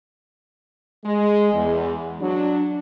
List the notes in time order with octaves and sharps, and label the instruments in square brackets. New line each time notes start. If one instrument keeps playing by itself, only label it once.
[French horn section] G#3
E2
F#3 D4